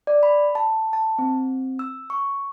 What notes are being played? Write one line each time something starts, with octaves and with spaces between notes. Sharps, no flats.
D5
B5
A5
A5
C4
E6
C#6